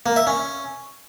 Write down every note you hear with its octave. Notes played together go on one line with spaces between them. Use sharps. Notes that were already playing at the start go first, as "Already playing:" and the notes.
A#3
E5
C#4